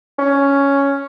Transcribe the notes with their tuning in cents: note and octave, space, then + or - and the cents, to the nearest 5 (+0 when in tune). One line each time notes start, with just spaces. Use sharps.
C#4 +5